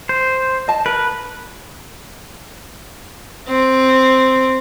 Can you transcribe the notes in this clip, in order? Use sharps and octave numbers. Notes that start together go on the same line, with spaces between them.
C5
D#5 A5
A#4 B4
C4